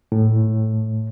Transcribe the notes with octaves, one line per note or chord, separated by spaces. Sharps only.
A2